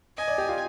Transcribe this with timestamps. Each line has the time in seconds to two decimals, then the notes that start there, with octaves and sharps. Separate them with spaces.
0.17 D#5 G#5
0.28 D5
0.38 G4
0.48 F4